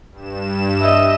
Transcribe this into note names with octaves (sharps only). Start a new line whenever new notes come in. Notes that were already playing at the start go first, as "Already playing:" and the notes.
G2 E7
D#5 E5